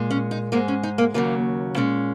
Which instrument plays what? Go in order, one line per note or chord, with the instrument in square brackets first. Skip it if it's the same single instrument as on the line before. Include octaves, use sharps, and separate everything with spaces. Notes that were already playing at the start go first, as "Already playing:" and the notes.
Already playing: [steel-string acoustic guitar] A#2 G#3
C#4
D#4
G#2 G#3 A#3
C#4
D#4
A#3
D#2 C#3 F#3 A#3
A#2 G#3 C#4